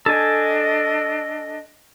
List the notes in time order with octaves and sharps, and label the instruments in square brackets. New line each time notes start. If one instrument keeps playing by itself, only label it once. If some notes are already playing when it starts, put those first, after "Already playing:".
[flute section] D4 D#5 [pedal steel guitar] A4 G#5